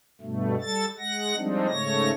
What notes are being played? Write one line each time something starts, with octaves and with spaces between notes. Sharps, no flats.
G2 B2 A3
G3 A4 A6
G#3 F#5 A#6
F3 G3 G#3 C4 D4 D#4
G#2 C#3 A3 C#5 A#6